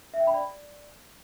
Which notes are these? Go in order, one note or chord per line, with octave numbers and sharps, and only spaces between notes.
E5
G5
B5
D5